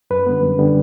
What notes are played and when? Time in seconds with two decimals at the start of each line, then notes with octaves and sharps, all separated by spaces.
0.10 F#2 B4
0.27 D3 G3 B3
0.43 F#2
0.59 D3 G3 B3